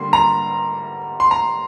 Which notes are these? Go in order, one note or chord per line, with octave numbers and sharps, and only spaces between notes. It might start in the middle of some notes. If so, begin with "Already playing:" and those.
Already playing: D3 G3 A#3 C6
A#5
C6
A#5